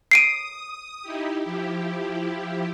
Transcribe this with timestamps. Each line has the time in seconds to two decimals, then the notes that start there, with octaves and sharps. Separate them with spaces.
0.11 D#6 C7 D7 D#7
1.03 D#4 E4 G4
1.43 F3 E4 G4